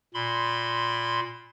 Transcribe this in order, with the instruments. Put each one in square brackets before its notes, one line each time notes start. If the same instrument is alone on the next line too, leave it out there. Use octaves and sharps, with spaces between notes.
[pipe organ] A#2 B5 C6